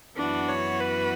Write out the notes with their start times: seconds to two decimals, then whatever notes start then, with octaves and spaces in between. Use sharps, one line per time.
0.16 F#2 E3 B3 D4 F#4
0.48 C#5
0.80 B4